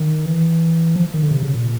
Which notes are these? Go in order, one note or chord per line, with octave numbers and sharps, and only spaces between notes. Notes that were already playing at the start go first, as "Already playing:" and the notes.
Already playing: D#3
E3
F3
D#3
D3
C3
C#3
A#2